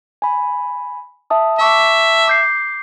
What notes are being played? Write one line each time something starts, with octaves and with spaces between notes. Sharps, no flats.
G#5 B5
E5 A5 D#6
E5 A5 C#6 D6
D6 G6 C7